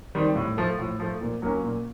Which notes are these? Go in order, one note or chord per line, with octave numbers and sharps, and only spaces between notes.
D#3 G3 C4
A2
F3 A3
A2
F3 A3
A#2
F#3 A#3 C#4
A#2